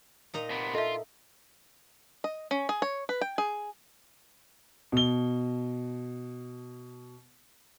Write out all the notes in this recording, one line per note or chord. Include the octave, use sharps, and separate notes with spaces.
A#2 D#4 A#5
C3 B3
F4 A4 D#5 E5
D#5
C#4
G#4
C#5
B4
G5
G#4
B2 G7